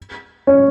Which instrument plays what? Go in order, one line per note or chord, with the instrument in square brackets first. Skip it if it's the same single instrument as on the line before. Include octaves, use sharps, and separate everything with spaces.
[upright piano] C#4